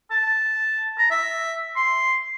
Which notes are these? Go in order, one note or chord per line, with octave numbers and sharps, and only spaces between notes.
A5
A#5
E5
C6